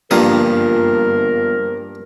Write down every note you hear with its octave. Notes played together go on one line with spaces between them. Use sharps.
G2 F3 G3 A#3 B3 F4 A#4 D#6